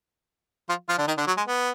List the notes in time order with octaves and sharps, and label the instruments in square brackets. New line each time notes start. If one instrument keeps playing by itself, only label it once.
[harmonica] F3 F4
F3 F4
D3 D4
D#3 D#4
D3 D4
F#3
G#3
B3